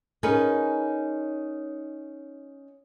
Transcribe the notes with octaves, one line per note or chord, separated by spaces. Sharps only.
C#4 D#4 G#4 A#4 B4 D#5